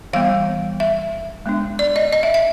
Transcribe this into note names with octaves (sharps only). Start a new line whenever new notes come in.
E3 G3 B3 F5
E5
G#3 B3 D4
D5
D#5
D#5
E5
E5